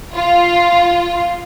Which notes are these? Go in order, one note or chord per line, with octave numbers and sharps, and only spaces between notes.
F4